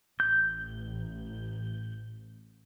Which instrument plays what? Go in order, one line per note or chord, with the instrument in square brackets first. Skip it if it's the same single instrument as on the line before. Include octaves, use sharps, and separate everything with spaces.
[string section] A1 [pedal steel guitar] G6